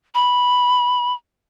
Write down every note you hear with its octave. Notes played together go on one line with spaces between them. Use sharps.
B5